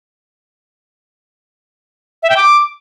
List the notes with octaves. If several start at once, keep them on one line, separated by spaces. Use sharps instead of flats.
E5
G5
D6